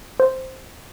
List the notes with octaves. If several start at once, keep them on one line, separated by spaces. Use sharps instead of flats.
C5